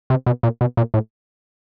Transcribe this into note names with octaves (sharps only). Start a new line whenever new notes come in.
C3
B2
A#2
B2
A#2
A2